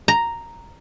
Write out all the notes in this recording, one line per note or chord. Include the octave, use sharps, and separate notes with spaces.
A#5